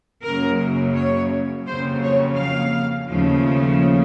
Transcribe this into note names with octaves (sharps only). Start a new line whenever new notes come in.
F#2 C#3 F#3 A#3 A#4
C#5
F2 C#3 F#3 A#3 C5
C#5
F5
D#2 C#3 F3 A3